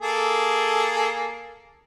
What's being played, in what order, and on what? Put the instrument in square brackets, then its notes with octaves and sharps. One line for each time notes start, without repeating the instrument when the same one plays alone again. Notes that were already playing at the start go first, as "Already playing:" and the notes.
[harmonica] A#3 G#4 A4